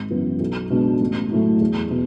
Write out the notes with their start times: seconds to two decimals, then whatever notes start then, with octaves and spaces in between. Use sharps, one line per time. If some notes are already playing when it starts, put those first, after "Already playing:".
Already playing: G#1
0.10 F#2 E3 B3
0.40 B1
0.70 B2 G#3 D4
1.01 A1
1.31 A2 F#3 A3 E4
1.61 E2
1.90 B2